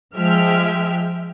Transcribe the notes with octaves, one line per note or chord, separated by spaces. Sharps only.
F3 G#3 E5 G5 F6